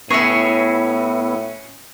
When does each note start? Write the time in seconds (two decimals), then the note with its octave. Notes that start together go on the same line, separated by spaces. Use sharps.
0.10 A2 B3 C#4 E4 F#4 G#4 C#5 E5